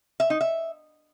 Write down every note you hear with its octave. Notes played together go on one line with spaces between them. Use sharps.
E5
D#4
E5